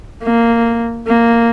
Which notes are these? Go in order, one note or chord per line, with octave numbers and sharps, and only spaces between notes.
A#3
A#3